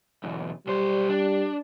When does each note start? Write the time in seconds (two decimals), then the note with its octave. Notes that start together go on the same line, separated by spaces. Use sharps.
0.24 B1 E2
0.67 B1 G3 C5
1.09 D4